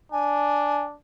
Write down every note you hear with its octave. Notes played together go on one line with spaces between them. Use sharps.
D4 G#5